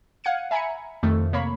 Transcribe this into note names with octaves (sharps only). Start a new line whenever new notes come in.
F5 F#5 G#6 C#7 D#7
E5 G#5 A#5 B5 G#6 C#7
F2 D#3 A3
C3 A#3 C#5 B5